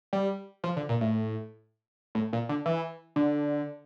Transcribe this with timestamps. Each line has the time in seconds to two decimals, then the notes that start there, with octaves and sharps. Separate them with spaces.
0.13 G3
0.64 F3
0.76 D3
0.89 A#2
1.01 A2
2.15 A2
2.33 A#2
2.49 D3
2.66 E3
3.16 D3